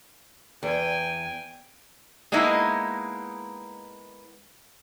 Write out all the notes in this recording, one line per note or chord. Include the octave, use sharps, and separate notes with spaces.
E2 G5 G#5
G#3 A#3 B3 D#4 E4